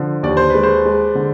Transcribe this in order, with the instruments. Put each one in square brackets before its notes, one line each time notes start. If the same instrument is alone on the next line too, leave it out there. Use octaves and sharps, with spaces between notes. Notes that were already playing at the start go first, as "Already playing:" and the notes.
Already playing: [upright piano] D3 F3
[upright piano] D#2 [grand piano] D5
[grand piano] C5
[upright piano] G#3 [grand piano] B4
[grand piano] C5
[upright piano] G#3
D3